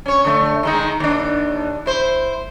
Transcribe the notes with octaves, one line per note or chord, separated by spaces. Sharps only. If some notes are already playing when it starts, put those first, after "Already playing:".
C#4 C#5
D3 A3
D#3 G#3 D#4
D#2 D4
E4 C5